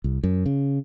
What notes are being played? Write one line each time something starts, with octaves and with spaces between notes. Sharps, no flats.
C2
F#2
C#3